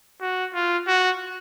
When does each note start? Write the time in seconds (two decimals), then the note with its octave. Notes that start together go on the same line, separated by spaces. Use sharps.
0.21 F#4
0.54 F4
0.87 F#4